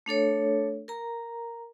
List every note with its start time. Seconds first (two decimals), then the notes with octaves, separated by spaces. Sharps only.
0.06 A3 D4 A4 C#5
0.88 A#4 A#5